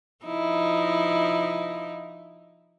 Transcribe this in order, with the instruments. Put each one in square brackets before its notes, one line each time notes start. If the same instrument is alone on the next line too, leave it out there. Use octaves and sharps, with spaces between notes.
[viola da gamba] F3 D#4 E4